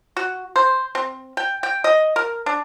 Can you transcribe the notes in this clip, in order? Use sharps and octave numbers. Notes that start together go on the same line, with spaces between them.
F#4
C5
C4
G5
G5
D#5
A#4
D4